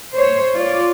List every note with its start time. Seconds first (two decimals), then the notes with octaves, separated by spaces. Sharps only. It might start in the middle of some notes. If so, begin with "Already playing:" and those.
0.14 C5 C#5
0.55 F4 C#5 D5